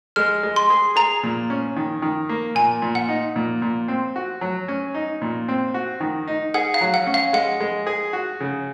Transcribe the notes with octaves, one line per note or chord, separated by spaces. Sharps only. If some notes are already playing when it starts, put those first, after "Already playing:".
G#3 F6
G#3
C6
G#4
G#4 A#5
A#2
C#4
D#3
D#3
A#3
A#2 G#5
A#2
F#5
D#4
A#2
A#2
C4
F#4
F#3
C#4
D#4
A#2
C4
F#4
D#3
D#4
G#4 F#5
F5
F#3
F#5
C#4
F5
G#3 F#5
G#3
G#4
F#4
C#3